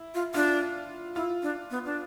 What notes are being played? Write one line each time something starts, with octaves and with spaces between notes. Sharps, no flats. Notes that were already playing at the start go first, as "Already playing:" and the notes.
Already playing: E4
F4
D4 F4
E4 F4
D4
B3
D4